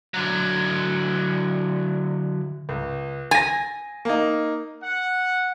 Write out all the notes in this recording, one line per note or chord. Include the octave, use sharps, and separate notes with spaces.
D3 F#3
C#2
G#5 A6 A#6
A#3 D#4
F#5